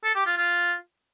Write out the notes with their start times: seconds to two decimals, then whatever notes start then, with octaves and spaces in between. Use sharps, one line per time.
0.04 A4
0.15 G4
0.26 F4
0.37 F4